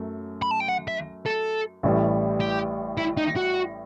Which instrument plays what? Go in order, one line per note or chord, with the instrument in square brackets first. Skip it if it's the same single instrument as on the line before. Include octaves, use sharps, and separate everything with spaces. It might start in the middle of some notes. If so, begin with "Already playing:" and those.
Already playing: [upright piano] F#2 F#3 A3
[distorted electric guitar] B5
A5
G5
F#5
E5
A4
[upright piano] A1 A2 E3 G3
[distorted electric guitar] G4
E4
D#4
F#4